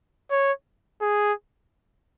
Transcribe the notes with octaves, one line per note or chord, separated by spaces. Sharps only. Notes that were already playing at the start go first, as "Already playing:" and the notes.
C#5
G#4